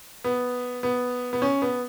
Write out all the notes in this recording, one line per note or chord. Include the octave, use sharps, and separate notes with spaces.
B3
B3
B3
C#4
B3